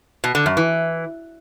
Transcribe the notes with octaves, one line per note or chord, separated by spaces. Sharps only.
B2
D3
F#2
E3